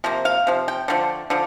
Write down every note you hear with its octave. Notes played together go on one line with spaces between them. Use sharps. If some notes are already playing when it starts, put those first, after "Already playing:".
C3 F3 A#3
F5
C3 F3
G5
D3 F3 A3
D3 F3